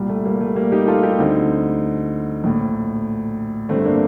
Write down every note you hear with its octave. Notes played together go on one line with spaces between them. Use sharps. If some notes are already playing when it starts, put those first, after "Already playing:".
Already playing: C2 A#2 G3
A3
G3 A#3
A3
G3 A#3
D#4 G4
F4 A4
D#4 G4
D2 D3 C4 D#4
A#1 A2
G1 G2 D3 A3 C4
A#3 D4